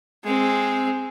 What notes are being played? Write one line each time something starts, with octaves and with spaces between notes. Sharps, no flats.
G#3 C4